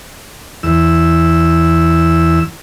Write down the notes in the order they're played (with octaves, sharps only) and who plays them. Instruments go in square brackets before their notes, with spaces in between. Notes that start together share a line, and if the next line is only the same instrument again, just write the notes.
[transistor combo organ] E2 E6